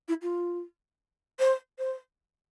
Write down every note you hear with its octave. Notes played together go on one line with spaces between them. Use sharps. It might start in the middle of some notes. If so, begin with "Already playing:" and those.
E4
F4
C5
C5